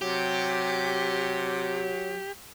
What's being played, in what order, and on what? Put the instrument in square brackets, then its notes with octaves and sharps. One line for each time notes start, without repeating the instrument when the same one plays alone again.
[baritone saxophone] C3 [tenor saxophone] F#3 [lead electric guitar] G4